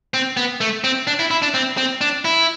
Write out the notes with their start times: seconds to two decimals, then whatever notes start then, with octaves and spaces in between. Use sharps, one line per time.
0.14 C4
0.37 B3
0.61 A3
0.84 C4
1.07 D4
1.19 E4
1.31 E4
1.42 D4
1.54 C4
1.77 C4
2.01 D4
2.25 E4